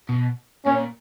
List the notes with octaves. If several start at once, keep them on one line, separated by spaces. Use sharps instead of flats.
B2
A#2 C#4